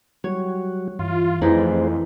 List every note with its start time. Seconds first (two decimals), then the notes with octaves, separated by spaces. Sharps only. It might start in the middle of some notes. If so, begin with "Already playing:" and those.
0.24 F#3 G3 F#4 C#5
0.99 G2 E3 F4
1.41 F2 E3 A3 D#4 G#4 C5 D5